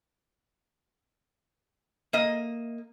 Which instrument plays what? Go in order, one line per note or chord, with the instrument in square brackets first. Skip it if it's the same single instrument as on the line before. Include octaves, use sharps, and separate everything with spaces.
[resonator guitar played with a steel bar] A#3 D#5